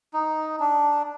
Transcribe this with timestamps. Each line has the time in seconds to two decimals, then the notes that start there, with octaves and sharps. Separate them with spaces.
0.14 D#4
0.60 D4